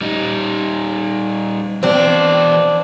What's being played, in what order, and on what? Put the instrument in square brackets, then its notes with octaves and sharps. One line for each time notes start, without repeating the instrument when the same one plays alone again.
[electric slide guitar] G3 D#4
[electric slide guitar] E3 B3 G5 [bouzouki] C4 D4